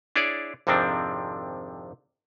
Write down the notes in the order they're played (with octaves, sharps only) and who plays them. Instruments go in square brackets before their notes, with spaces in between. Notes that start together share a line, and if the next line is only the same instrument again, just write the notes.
[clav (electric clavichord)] D4 E4 G#4 C#5 D5
G#1 F2 C3 F3 C4 D4